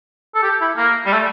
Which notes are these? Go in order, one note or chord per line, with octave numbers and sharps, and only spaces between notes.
A4
G4
E4
A#3
G3
A3